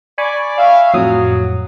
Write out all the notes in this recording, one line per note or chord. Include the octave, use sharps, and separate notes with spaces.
D5 G#5 B5 C#6
E5 F5
F2 A2 F#3 D#6